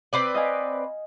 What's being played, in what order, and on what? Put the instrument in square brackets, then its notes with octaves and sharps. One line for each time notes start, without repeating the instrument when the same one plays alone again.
[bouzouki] C4 B4 D5
[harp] D#5 F5 G#5